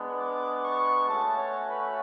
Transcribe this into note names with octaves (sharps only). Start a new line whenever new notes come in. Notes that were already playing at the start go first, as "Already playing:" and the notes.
Already playing: G#3 B3 D4
D6
C#6
A3 C#4 F#4 A5
C#5
B4